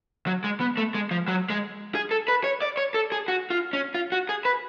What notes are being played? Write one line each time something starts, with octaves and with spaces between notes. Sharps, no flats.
F#3
G#3
B3
A3
G#3
F3
F#3
G#3
G#4
A4
B4
C#5
D5
C#5
A4
G#4
F#4
F4
C#4
F4
F#4
G#4
B4